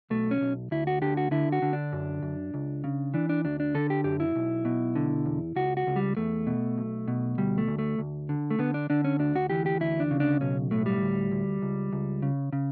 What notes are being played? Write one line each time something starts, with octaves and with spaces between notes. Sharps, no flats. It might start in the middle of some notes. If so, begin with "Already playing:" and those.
B1 A3
C#4
B1
D2 E4
F#4
D3 G4
F#4
D3 E4
F#4
D3
D4
F#2
F#2
C#2
C#3
E3 D4
D4
D2 D4
D4
D3 A4
G4
F#2 G4
E4
B1
B2
D3
E2
C#2 F#4
F#4
C#2
G3
E2 A3
B2
B1
B2
D2 G3
A3
D2
A3
D2
D3
A3
D3 B3
D4
D3 D4
C#4
D2 D4
F#4
E3 G4
G4
D2 E4
D4
C#3
D4
B1 C#4
A2 A3
G3
D2
D2
C#2
C#2
C#3
C#3